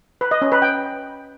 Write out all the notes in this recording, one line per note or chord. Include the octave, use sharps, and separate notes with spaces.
B4
D#5
C#4
B4
G5